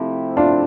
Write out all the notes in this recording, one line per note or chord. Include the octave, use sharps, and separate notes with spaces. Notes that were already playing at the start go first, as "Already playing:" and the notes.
Already playing: C3 F3 A3 C4 E4 G4
D4 F4